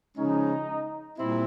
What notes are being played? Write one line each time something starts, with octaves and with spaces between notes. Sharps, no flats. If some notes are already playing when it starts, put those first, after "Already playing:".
C#3 F3 G#3 C#4 D#4
A#2 G3 C4 E4